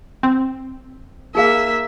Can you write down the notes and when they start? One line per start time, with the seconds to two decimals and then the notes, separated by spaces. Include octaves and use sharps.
0.23 C4
1.35 A#3 D#4 G#4 E5 F5